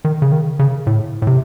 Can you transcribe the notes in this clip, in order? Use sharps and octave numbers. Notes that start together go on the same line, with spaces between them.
D#3
C#3
D#3
C#3
A2
A2
C3